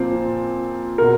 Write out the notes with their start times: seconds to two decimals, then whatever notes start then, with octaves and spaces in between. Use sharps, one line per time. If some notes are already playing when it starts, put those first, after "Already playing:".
Already playing: A#2 F3 C4
0.98 B2 A#4